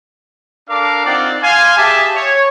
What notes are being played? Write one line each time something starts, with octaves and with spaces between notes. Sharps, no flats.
D4 A4 A#4 F5 D6
C4 D#4 F4 D5 F#5 G5
F5 G#5 C6
G4 G#4 E5 A5 D6
C#5